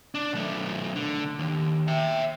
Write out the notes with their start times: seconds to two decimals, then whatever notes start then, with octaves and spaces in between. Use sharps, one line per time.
0.15 D4
0.33 B1 A3
0.95 D3
1.39 D#2
1.88 E5 G5